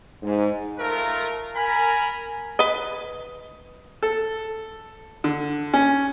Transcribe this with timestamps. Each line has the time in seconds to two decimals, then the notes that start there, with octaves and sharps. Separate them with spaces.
0.23 G#2
0.80 A3 F4 A#4
1.56 A#4 G#5 B5
2.59 B4 D#5
4.03 A4
5.24 D3
5.74 C#4